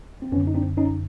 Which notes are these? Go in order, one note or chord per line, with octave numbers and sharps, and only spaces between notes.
C4
F#2 D3 B3 C#4
D#4
C4 D4
C#4 D#4